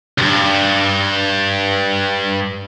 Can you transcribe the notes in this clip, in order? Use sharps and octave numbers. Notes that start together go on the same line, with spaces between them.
C#2 G2